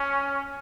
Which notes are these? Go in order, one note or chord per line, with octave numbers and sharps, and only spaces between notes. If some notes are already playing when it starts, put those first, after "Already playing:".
Already playing: C#4